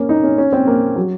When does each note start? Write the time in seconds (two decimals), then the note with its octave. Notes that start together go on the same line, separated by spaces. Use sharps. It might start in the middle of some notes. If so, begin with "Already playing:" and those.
Already playing: A#3 C#4
0.09 D#4
0.24 C#4
0.38 C#4
0.52 C4
0.67 A#3
0.96 F#3